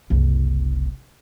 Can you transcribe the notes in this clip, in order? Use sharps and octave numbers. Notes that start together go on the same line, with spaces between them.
F#1 C2